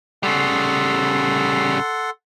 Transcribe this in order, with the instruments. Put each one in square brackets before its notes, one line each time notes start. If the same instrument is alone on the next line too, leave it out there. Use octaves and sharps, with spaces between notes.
[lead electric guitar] C#3 G3 [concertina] A4 F#5 C6